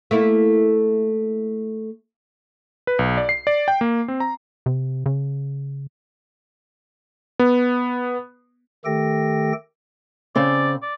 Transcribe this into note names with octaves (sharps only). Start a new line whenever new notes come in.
A3 A#3 E4
B4
B1
D5
C7
D5
G5
A#3
C4
A#5
C3
C#3
B3
D#3 A3 G4 A4 G5 A#6
C#3 C4 D5
D5